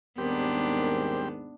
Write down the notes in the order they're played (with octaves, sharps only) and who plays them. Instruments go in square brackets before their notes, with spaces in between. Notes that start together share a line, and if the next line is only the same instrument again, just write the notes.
[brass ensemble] D#2 G#2 [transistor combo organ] G3 C4 G4 [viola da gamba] B3 D4 [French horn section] A#4